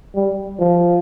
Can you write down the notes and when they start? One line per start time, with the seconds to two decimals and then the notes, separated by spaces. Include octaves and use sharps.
0.15 G3
0.60 F3